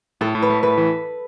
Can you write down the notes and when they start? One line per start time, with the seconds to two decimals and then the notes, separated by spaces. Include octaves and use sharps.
0.21 A2 A4
0.35 A2
0.42 B4
0.50 A3
0.63 A2 B4
0.78 E3